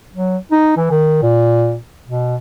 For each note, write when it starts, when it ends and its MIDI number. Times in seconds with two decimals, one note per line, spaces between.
0.14 0.37 54
0.52 0.74 63
0.77 0.91 52
0.91 1.18 51
1.22 1.78 46
2.08 2.36 47